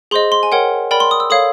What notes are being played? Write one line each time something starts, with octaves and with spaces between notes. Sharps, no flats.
G#4 C5 D#5 C6
C6
G#5
A#4 C#5 F#5 G5
A#4 D5 G5 B5
C6
D#6
E6
A4 C#5 F5 D#6